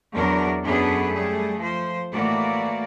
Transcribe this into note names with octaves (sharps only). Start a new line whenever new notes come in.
E2 F#3 D4 F#4 A#4
F#2 B3 D4 G#4 A4 B4
G3 A3 G#4
F3 C5
A2 E3 A3 A#3 F#4 D5